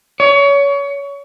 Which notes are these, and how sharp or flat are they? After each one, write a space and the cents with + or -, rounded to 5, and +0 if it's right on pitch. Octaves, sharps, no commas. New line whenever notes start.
C#5 +25